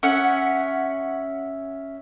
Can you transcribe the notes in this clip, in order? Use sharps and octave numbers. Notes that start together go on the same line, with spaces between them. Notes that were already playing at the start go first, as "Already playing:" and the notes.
C#4 E5 F#5